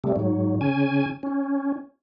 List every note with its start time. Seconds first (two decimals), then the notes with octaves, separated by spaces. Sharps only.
0.04 C3 G3 A3
0.16 G#2 F#3
0.61 C#3 C#4 G#5
1.23 C#4